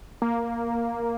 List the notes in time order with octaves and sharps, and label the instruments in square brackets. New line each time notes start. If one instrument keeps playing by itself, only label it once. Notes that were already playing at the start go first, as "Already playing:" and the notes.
[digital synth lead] A#3